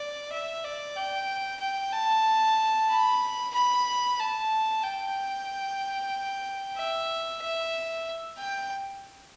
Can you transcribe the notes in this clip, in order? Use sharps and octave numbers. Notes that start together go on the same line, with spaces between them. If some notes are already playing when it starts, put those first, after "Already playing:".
Already playing: D5
E5
D5
G5
G5
A5
B5
B5
A5
G5
E5
E5
G5